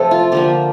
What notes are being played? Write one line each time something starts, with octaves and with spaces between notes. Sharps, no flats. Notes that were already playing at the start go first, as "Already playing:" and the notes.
Already playing: C3 F3 A3 A4
F4
D3 F3 A#3 G4